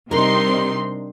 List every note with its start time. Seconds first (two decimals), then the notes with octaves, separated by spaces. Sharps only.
0.11 C3 G3 C4 D4 D#4 A#4 C6